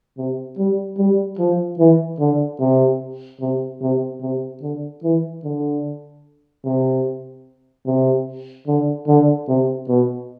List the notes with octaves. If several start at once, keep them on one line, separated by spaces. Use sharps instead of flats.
C3
G3
G3
F3
E3
D3
C3
C3
C3
C3
D3
E3
D3
C3
C3
D3
D3
C3
B2